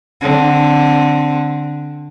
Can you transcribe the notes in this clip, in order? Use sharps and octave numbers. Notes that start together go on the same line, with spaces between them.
D3 C4